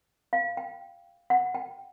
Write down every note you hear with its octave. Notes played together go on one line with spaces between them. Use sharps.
F5
G5
F#5
G5